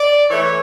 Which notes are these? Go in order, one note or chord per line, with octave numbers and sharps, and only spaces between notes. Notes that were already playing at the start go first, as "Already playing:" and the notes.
Already playing: D5
E3 A3 C#5